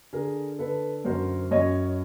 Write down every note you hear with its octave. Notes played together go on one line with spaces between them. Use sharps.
D3 G#4 A#4
D3 A4 B4
F#2 A#4 C5
F#2 C#5 D#5